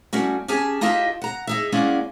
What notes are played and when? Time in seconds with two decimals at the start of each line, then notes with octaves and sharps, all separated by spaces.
0.13 G3 A3 C#4 F#4
0.48 C#4 G4 G#4 G#5 A5
0.81 D#4 F4 G4 A4 D#5 E5
1.22 F#5 A#5
1.47 D#4 G#4 E5
1.72 G#3 A#3 C#4 E4 D5 F#5